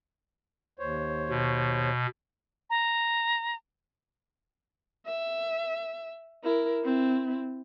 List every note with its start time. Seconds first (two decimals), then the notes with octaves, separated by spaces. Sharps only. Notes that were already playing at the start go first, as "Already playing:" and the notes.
0.79 D#2 C5 C#5
1.29 B2
2.70 A#5
5.07 E5
6.44 E4 A#4
6.84 C4 E4